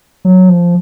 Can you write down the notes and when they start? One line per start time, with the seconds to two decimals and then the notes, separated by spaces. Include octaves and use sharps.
0.25 F#3
0.49 F3